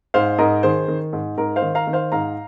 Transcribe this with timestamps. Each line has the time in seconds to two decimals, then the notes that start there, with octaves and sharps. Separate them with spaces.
0.14 G#2 C5 F5
0.38 G#2 A#4 D#5
0.63 D#3 G#4 C5
0.88 D#3
1.13 G#2
1.37 G#2 A#4
1.56 C5 F5
1.62 D#3
1.75 F5 A#5
1.87 D#3
1.93 C5 F5
2.12 G#2 F5 A#5